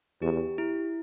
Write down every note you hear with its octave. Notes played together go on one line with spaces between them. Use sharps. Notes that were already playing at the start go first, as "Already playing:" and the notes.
E2 G4
E4